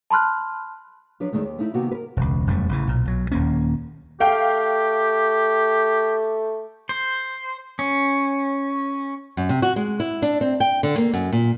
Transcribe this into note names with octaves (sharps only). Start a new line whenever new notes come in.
A5 B5 C6 F6 F#6
F3 F#3 D4 B4
E2 D#3 G#3 A3
D#2
A3 D#4 E4
C3 D#3 A#3 B3 D#4 F#4
A#4 B4
E1 C#2
E1 F#2 G3 A3
A1 C#3 E3
B1 A#2
B1 F#3
D#1 D#2 A#3 C#4
A3 G4 F5 G5
C5
C#4
F#2
C3
F#4
G#3
E4
D4
C4
G5
D3
A#3
F#2
A#2